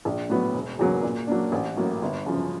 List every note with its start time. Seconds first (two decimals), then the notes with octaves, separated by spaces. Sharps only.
0.05 A#1
0.30 A2 F#3 B3
0.54 E1
0.79 E2 C#3 F#3 A#3
1.03 A#2
1.27 F#3 A#3 D4
1.52 A1
1.77 A2 F#3 A#3
2.02 G1
2.26 F#2 C#3 F3